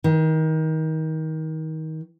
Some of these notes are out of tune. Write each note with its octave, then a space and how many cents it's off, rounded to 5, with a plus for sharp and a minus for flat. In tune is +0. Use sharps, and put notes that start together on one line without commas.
D#3 +25